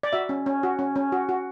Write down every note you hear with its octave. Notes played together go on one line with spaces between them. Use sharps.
D5
F#4 E5
C#4
C#4
F#4
C#4
C#4
F#4
F#4